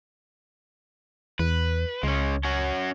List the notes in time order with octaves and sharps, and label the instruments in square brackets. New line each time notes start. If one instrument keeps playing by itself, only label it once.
[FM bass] E2 [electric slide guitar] B4
[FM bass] C#2 [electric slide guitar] G#3 C#4
[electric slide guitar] C#4 F#4 C#5